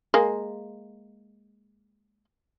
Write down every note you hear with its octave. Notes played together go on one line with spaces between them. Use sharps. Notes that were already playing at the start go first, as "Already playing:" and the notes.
G#3 A#3